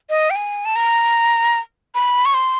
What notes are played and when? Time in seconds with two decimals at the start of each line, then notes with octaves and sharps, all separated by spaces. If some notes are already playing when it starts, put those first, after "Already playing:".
0.10 D#5
0.30 G5
0.36 G#5
0.65 A5
0.76 A#5
1.95 B5
2.25 C#6
2.34 C6